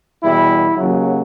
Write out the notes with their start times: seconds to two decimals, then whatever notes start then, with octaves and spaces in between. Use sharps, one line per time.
0.23 E2 B2 G3 E4
0.77 D#2 C#3 F#3